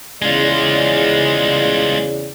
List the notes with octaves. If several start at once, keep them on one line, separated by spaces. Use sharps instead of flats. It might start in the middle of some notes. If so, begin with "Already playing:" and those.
E2 C#3 G#3 F4 D5